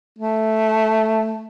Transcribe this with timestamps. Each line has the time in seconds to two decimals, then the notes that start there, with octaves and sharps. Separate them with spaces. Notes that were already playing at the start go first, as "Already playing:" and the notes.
0.18 A3